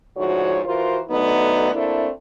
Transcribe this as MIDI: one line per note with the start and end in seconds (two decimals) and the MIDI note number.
0.17 0.59 38
0.17 0.59 44
0.17 0.59 53
0.17 0.59 66
0.17 0.59 73
0.65 1.00 52
0.65 1.00 65
0.65 1.00 66
0.65 1.00 70
0.65 1.00 72
1.09 1.70 50
1.09 1.70 54
1.09 1.70 57
1.09 1.70 59
1.09 1.70 63
1.73 2.08 57
1.73 2.08 58
1.73 2.08 60
1.73 2.08 62
1.73 2.08 64